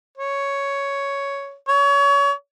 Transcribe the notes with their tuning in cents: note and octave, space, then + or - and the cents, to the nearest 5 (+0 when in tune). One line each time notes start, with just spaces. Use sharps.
C#5 +5
C#5 +30